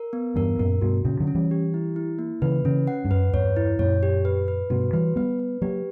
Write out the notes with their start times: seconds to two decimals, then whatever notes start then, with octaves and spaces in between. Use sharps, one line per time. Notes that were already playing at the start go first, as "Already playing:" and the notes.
Already playing: A#4
0.13 B3
0.36 E2 G2 A#4
0.59 F#2 A#2 A#4
0.81 G2 B2 F#4
1.05 A#2 C#3 C#4
1.20 D3 F#3
1.27 C#4
1.35 E3 G3
1.51 G4
1.74 E4
1.96 E4
2.19 A#3
2.42 C#3 E3 B4
2.65 C#3 E3 C#4
2.88 F#5
3.05 G2
3.11 F#2 B4
3.33 E2 G2 C#5
3.56 E4
3.79 F#2 A#2 C#5
4.03 G4
4.25 B4
4.48 B4
4.70 G2 B2 F#4
4.93 E3 G3 B4
5.16 G3 B3 B4
5.39 B4
5.62 F#3 A#3 G4